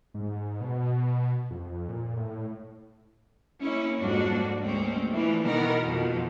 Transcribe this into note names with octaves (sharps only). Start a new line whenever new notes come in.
G#2
B2
F2
A#2
A2
A#3 C#4 E4
F2 G#2 G3 A#3 D4 F#4
D2 G3 G#3 A#3 C4 C#4
E3 F3 A3 A#3 D4 E4
B2 D#3 E3 B3 A#4 B4
F2 B2 D#3 F3